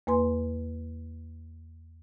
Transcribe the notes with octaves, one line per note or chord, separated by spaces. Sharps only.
E2 A#3 B4 G#5 C6